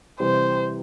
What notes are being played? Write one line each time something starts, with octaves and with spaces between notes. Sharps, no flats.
C3 E3 G3 C5